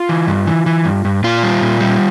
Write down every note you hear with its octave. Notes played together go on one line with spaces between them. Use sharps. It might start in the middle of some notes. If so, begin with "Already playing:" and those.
Already playing: F4
E3
G2
E3
E3
G2
G2
A#2 F4
G3
A#2
G3